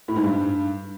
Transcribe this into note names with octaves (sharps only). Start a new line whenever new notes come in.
A2
G#2
G2